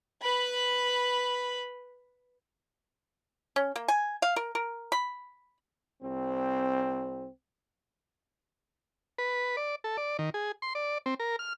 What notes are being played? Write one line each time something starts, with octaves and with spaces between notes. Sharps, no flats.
B4 B5
C#4
A#3
G#5
F5
A#4
A#4
B5
C2 C4
B4
D5
A4
D5
D#3
G#4
C6
D5
C4
A#4
F6